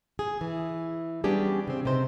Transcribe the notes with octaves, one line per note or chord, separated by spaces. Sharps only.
G#4
E3
G3 B3 C#4 D4 G4 G#4
C#3 C4
C3 D#4 C5